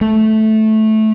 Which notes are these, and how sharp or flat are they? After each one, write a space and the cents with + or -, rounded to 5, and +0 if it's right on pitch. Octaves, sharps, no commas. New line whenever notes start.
A3 -10